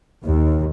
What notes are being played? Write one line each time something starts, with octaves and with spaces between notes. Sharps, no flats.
D#2